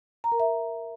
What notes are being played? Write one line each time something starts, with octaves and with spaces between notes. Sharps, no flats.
A#5
A#4
E5